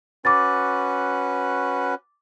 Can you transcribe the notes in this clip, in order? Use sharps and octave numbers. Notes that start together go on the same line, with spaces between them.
C#4 F#4 B4 D6 A6